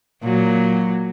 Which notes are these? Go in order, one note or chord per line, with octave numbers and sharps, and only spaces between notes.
A#2 F#3